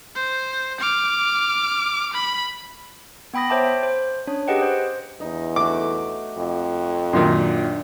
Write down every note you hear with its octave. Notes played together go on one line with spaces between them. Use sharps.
C5
D6 F6
B5
B3 G5 B5 D#6 A#6
C5 C#5 E5 G5 A5 D6
C5
C#4 D4 C#5
G4 G#4 B4 D#5 F#5 G5
C5
E2 D#4
A3 F#4 D6
F2
F#2 A#2 D#3 D4 C6